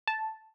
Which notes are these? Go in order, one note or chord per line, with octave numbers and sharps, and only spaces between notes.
A5